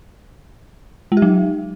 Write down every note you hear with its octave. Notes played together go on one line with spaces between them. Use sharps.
G#3
G4
F#3